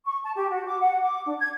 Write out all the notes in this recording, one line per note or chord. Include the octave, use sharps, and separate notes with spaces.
C#6
A5
G4
F#4
D6
F#5
D6
D4
G#6